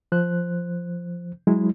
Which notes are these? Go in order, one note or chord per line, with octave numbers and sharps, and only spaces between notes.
F3 C5 F#6
F#3 G#3 E4